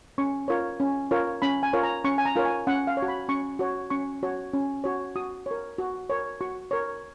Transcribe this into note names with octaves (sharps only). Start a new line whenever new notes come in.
C#4 C#6
F4 A#4 C#5
C#4
F4 A#4 C#5
C#4 B5
G#5
F4 A#4 C#5
A#5
C#4 C#6
G#5
A#5
F4 A#4 C#5
G#5
C#4 F#5
F5
C#5
F#4
B5
C#4 C#6
F#4 C#5
C#4 C#6
F#4 C#5
C#4
F#4 C#5
F#4 D#6
A#4 C#5
F#4
A#4 C#5
F#4 C#6
A#4 C#5